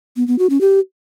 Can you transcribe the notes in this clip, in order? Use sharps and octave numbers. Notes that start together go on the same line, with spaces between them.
B3
B3
F#4
C#4
G4